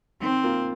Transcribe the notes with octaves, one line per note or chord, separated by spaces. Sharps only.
D#3 C4
A#3 F4